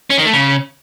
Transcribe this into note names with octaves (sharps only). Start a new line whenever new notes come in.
C#4
D#3
A3
C#3